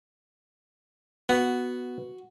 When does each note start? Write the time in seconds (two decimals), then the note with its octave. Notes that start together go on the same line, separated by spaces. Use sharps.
1.29 B3 F#4